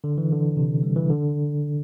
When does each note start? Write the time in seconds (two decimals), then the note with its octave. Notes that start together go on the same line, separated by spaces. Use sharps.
0.04 D3
0.18 E3
0.32 D3
0.57 C3
0.83 G3
0.96 E3
1.10 D3